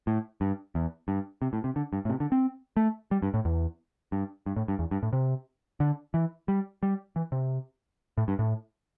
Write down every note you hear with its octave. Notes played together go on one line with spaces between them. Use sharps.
A2
G2
E2
G2
C3
A2
C3
D3
G2
A2
C3
D3
C4
A3
G3
G2
A2
E2
G2
G2
A2
G2
E2
G2
A2
C3
D3
E3
G3
G3
E3
C3
A2
G2
A2